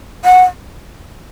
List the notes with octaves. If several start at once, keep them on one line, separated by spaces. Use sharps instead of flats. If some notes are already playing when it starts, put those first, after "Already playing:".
F#5